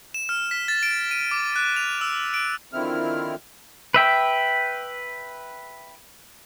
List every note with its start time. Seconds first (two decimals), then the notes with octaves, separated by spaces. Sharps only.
0.14 E7
0.29 F6
0.51 B6
0.68 A6
0.83 D7
1.11 D#7
1.31 D6
1.56 F#6
1.76 F7
2.01 E6
2.34 D7
2.73 D3 D#3 F3 C4 E4 F6
3.94 B4 E5 G5